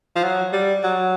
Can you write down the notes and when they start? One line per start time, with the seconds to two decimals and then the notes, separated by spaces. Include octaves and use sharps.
0.16 F3
0.24 F#3
0.53 G3
0.84 F#3